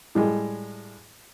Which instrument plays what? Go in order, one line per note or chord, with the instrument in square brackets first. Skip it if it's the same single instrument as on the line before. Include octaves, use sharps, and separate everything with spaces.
[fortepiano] A2 G3 G#3